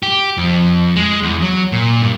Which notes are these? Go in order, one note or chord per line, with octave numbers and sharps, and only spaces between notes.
G4
F2
G#3
E2
F#3
A#2
G2